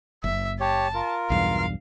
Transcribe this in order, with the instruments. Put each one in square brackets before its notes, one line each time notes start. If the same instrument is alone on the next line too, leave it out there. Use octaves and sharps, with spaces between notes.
[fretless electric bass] F#1 [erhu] E5
[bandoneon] G4 C#5 [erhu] A5
[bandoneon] F4 A#4
[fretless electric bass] B1 E2 G2 [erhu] F5